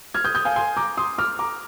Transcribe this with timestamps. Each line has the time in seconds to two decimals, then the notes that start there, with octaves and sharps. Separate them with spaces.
0.14 F6 G#6
0.25 D#6 G6
0.35 D#6 G6
0.45 F5 G#5
0.56 G#5 C6
0.77 A#5 D6
0.97 C6 D#6
1.18 D6 F6
1.39 A#5 D6